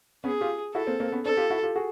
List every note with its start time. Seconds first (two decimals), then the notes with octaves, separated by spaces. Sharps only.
0.24 B3 C#4 G#4
0.41 F4 G4
0.74 E4 F#4 A4
0.87 A#3 C4
1.00 A#3 C4
1.12 B3 C#4
1.25 C4 D4 A4
1.37 F4 G4
1.50 E4 F#4
1.63 F4 G4
1.75 F#4 G#4